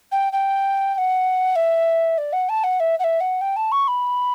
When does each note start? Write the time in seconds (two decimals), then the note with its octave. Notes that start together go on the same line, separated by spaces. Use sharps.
0.12 G5
0.33 G5
0.94 G5
0.98 F#5
1.56 E5
2.18 D5
2.33 F#5
2.49 A5
2.64 F#5
2.80 E5
2.99 F#5
3.04 E5
3.20 F#5
3.41 G5
3.56 A5
3.72 C#6
3.88 B5